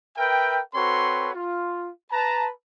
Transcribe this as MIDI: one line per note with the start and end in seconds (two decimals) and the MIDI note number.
0.17 0.60 70
0.17 0.60 71
0.17 0.60 76
0.17 0.60 79
0.74 1.30 60
0.74 1.30 66
0.74 1.30 69
0.74 1.30 71
0.74 1.30 73
0.74 1.30 84
1.34 1.89 65
2.12 2.49 71
2.12 2.49 81
2.12 2.49 82